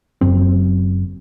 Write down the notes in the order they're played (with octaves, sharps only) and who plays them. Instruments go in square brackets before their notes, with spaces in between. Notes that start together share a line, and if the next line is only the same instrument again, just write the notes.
[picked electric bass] F#1 F#2 C4